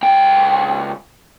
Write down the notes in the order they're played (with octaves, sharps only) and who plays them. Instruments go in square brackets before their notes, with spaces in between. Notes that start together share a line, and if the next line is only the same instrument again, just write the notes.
[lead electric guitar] C#2 G5